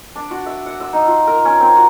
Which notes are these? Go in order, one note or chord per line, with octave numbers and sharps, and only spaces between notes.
D4
F#4
E5
F#5
E6
D#4
F4
A#4
C#4
C4
F#4